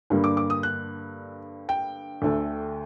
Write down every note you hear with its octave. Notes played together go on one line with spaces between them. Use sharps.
G2 D3 G3 A#3
D6
D6
D#6
F#6
G5
D2 D3 A3